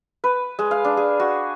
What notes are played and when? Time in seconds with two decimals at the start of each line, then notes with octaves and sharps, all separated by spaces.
0.24 B4
0.59 G#3
0.71 F5
0.84 D4
0.97 G#4
1.20 F#4